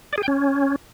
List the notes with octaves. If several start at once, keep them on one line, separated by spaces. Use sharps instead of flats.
D5
G#4
G5
C#4